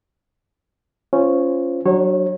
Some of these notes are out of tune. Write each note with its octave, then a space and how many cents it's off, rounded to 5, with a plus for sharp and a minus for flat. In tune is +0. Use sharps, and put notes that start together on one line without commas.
C#4 +0 F4 -15 C5 -20
F#3 +15 D4 +10 C#5 -35